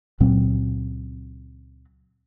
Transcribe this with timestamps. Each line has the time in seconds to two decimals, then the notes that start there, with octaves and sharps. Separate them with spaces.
0.20 C#2 A#2 F#3 C4